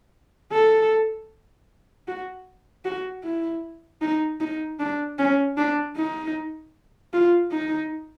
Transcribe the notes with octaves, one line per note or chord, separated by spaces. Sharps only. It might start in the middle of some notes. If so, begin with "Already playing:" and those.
A4
F#4
F#4
E4
D#4
D#4
D4
C#4
D4
D#4
F4
D#4